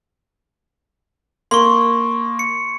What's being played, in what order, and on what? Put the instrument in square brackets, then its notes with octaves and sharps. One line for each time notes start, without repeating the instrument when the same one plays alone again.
[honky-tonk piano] A#3 [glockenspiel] C6 C#6
[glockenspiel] C#7